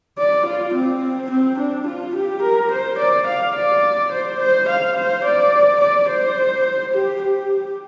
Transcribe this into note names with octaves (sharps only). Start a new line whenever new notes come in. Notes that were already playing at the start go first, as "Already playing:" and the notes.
D5
F4
C4
C4
D4
F4
G4
A#4
C5
D5
F5
D5
C5
C5
F5
C5
D5
D5
C5
G4
G4